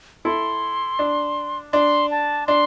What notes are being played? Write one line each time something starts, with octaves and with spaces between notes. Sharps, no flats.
E4 A4 C6
D4
D4 C6
A5
D4 C6